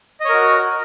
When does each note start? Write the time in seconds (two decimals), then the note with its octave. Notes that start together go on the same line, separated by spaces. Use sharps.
0.21 D#5
0.25 C#5
0.29 A#4
0.33 F#4